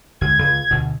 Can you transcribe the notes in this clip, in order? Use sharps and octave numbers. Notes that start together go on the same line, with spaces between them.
D2 G#3 G#6
C#2
D2 B2